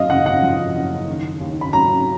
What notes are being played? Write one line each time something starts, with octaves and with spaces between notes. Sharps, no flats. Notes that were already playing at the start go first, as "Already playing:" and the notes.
Already playing: F#2 D#5 F5
F#1 F#5
F#5
F3
F#1
D#3
D#2
B5
F#3 A#5